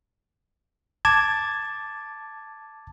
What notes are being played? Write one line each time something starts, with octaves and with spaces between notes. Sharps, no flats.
A5 D6 G#6